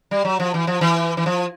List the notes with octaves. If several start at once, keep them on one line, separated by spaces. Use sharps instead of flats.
G3
F#3
F3
E3
F3
E3
E3
F3